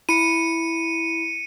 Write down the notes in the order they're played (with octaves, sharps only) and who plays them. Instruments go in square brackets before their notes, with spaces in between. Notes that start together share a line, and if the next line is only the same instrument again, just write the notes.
[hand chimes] E4 B5 [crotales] C#7 D#7